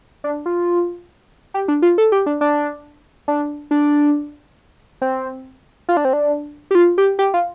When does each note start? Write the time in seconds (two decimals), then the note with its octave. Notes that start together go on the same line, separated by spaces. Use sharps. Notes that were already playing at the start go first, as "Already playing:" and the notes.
0.24 D4
0.46 F4
1.54 G4
1.68 D4
1.82 F4
1.98 A4
2.12 G4
2.26 D4
2.41 D4
3.28 D4
3.71 D4
5.02 C4
5.89 F4
5.97 D4
6.05 C4
6.13 D4
6.71 G4
6.75 F4
6.98 G4
7.19 G4
7.34 F4